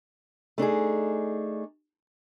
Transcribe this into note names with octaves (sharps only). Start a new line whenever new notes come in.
A3 D4 D#4 G#4